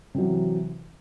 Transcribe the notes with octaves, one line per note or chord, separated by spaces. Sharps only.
C3 E3 F#3